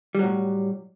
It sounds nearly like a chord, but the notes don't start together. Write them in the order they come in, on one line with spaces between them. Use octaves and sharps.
G3 F#3 A2